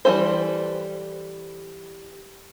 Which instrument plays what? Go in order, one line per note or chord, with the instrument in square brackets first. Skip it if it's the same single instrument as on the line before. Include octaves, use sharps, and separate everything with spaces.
[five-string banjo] E3 G3 C#4 A4 C5